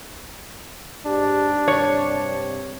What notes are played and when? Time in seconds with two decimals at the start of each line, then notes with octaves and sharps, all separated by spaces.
1.06 G#2 D4 G4
1.68 G2 C3 C#5